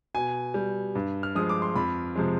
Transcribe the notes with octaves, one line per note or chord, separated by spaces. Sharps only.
B2 G#5
G3
G2
F6
F3 G#3 D#6
D6
C6
F2 B5
C3 F3 G#3